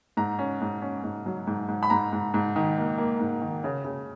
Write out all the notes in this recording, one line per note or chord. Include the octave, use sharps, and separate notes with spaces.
G#2 A#5
C#4
G#2
C#4
G#2
F#3
G#2
G#2
B5
G#2 A#5
G#2
G#2
D#3
A#3
A#3
G#2
D#3
C#3
C#3